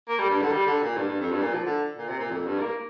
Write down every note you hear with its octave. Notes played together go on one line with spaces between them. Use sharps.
A#3
G3
G2
D3
G3
D3
A#2
G2
G2
F2
G2
A#2
F3
D3
A#2
C3
A#2
F2
G2
A#3